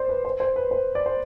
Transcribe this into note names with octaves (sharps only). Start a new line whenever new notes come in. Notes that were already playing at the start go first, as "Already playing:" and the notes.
Already playing: C5 D5
B4
C5
C5
B4
C5
D5
C5